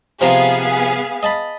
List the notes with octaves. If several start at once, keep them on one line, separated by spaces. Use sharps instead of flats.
C3 F3 B3 G#4 F5 A#5
D#5 A5 B5